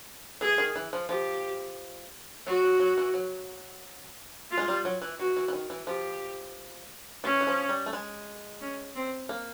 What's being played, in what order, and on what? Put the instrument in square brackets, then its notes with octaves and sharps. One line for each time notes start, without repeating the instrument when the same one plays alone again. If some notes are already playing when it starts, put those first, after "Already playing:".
[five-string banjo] E3 [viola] G#4
[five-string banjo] D#3
E3
F3
[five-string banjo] F3 [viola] G4
[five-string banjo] F#3 [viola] F#4
[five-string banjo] F#3
F#3
E3
F#3
[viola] F4
[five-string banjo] G#3
G3
F#3
E3
[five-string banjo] E3 [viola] F#4
[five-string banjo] E3
E3
D#3
E3
[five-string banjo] F3 [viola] G4
[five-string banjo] E3 [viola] C#4
[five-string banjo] E3
F3
G3
A3
G#3
[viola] C#4
C4
[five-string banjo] A#3